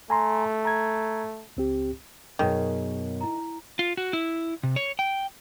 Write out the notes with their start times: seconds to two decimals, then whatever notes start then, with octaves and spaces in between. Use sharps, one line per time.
0.10 A3 G#5 A#5 C6
0.65 A#5 G#6
1.57 C#2 C4 G4
2.39 F#2 B2 D#3 G#4 C#5
3.21 E4 A#5
3.79 F4
3.97 F#4
4.13 E4
4.63 C3
4.76 C#5
4.99 G5